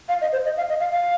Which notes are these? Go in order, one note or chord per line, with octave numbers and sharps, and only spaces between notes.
F5
D#5
C5
D#5
F5
D#5
F5
F5